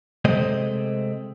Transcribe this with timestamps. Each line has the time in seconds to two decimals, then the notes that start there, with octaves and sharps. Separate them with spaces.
0.25 C3 G#3 A3 C4 C5 D#5